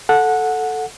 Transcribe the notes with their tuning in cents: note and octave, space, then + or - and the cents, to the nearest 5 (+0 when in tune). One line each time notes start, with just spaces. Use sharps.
A4 +0 F#5 -15